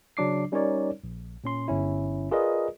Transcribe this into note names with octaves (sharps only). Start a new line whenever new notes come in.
C#3 F#3 D4 D6 C7
G3 C#4 D#4 A#4 C#5 D5
A#1
A#2 C#4 C6
G1 C#4 E4
F4 G#4 A#4 B4 D5 D#5